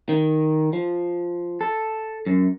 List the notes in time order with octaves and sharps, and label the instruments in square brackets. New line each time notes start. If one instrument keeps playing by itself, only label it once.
[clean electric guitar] D#3
F3
A4
F#2